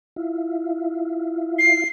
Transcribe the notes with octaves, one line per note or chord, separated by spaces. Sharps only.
E4 F4
C7